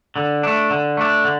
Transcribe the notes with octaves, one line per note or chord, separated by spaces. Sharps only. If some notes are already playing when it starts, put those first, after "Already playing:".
D3
A3 D4
D3
A3 D4
D3